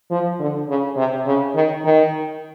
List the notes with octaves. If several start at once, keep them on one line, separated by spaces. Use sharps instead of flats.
F3
D3
C#3
C3
C#3
D#3
D#3